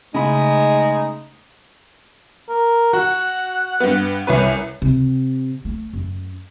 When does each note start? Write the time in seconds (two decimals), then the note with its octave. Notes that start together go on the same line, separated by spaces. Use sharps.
0.14 C#3 G#3 A3 D#4 B5
2.48 A#4
2.93 F#4 F#5
3.80 G2 B3
4.27 C2 C#4 B4
4.82 C3
5.65 A3
5.93 F#2